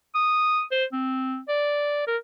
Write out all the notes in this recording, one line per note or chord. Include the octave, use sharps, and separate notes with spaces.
D#6
C5
C4
D5
A#4